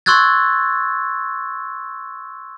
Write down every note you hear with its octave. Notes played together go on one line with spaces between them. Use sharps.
C6 C#6 E6 F#6 G#6 A6